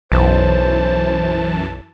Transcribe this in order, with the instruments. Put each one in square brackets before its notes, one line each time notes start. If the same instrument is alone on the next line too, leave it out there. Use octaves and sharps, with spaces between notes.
[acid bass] B1 [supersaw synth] F#2 E3 A5 [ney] C5